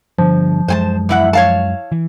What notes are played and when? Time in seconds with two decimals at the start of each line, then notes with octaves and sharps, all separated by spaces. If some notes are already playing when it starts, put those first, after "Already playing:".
0.19 G2 D3 F3
0.68 F#2 G#3 C5 G#5 A5
1.09 E2 E4 F#5
1.33 C#5 F5 A5
1.92 E3